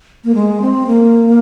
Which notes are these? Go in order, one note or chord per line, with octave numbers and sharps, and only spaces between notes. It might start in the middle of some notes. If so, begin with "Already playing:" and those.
A#3
G#3
C4
A#3